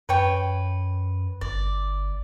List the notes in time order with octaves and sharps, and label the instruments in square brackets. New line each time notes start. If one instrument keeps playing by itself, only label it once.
[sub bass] F#2 [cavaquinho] B4 C#5 G5
[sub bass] G1 [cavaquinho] D5